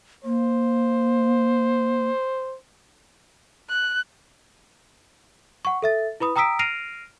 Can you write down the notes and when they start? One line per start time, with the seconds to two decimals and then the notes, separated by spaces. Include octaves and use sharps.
0.25 A#3 C5
3.70 F#6
5.65 F#5 C#6
5.82 A4 E5 A6
6.20 E4 B4 B5 D#6
6.36 G5 A#5 D#6 E6 B6 D7
6.59 F6 A#6 C7 D7 D#7 F7